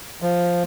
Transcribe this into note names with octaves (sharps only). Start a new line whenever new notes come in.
F3